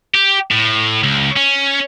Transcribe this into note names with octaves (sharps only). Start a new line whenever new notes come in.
G4
A2
C#2
C#4